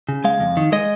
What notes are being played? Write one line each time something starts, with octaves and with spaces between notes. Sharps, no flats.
C#3
G#3 F5
F2
D#3
G#3 D#5